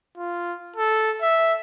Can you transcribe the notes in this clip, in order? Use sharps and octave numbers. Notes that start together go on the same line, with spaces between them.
F4
A4
E5